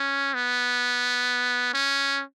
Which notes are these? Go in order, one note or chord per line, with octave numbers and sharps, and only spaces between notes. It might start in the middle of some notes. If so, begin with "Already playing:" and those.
Already playing: C#4
B3
C#4